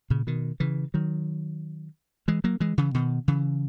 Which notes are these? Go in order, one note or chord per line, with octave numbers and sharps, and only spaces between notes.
A#2 C#3
B2 D#3
C#3 E3
D#3 F#3
E3 G#3
F#3 A#3
E3 G#3
C#3 E3
B2 D#3
C#3 E3